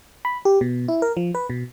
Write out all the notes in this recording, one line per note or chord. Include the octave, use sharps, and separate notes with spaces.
B5
G4
B2
E4
A#4
F3
B4
B2